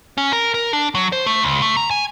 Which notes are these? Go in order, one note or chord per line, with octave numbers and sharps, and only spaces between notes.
C#4
A#4
A#4
D4
F#3
C5
A3
C#2
A3
A#5
G#5